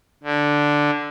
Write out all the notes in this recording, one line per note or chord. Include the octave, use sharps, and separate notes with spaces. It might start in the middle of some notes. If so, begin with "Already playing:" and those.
D3